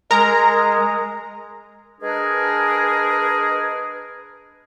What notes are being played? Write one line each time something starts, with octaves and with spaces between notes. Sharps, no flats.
G#3 A#4 A#5
G#3 D4 G#4 A#4 B4